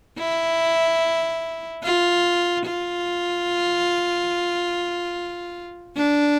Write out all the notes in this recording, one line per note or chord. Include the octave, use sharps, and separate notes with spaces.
E4
F4
F4
D4